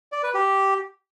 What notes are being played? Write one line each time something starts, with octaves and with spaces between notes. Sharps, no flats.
D5
B4
G4